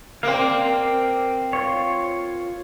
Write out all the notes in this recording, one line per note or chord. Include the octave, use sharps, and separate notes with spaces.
A#3 C4 D5 F5
F4 C#5